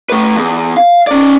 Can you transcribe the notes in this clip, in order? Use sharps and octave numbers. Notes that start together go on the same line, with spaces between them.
A3 B4
E2
F5
C#4 D5